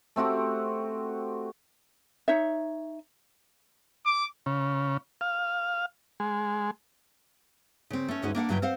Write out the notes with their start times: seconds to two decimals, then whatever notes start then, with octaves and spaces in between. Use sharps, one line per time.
0.16 A3 C4 F#4 G4
2.28 D#4 C#5 E5
4.05 D6
4.46 C#3
5.21 F5
6.20 G#3
7.90 C#3 C4
8.08 A3 C#4
8.22 D2 G2 G#3 C#4 D#4 F#4
8.35 A#3 D4 F5 F#5
8.49 G2 C#3 F#3 E4 C#5 G5
8.62 C4 C5 F5 F#5